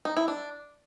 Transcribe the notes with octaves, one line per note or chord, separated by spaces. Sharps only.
D#4
E4
D4